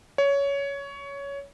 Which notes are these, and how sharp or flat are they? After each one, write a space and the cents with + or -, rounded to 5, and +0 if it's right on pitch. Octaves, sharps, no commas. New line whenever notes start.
C#5 +15